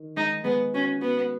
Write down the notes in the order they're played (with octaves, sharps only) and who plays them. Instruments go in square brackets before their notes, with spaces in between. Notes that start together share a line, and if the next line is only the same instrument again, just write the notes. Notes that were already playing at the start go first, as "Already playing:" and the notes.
Already playing: [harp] D#3
[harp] G#3 [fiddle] D#4
[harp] G#3 [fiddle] B3
[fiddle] C#4 [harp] F#4
[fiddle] B3 [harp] F#4